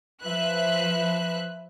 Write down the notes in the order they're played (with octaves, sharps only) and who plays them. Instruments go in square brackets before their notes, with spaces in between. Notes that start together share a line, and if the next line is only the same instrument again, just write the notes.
[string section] F3 B4 E5 F#6